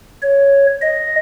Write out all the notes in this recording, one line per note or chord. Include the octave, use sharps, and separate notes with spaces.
C#5
D#5